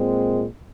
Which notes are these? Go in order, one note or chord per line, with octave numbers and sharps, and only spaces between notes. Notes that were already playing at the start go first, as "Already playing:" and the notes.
Already playing: A#2 G#3 C4